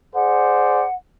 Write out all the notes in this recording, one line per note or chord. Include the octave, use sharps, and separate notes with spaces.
G#4 C5 D5 F#5